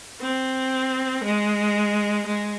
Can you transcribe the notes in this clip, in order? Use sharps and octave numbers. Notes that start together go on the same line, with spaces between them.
C4
G#3
G#3